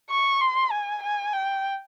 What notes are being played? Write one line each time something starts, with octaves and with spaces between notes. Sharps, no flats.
C#6
C6
G#5
G#5
G5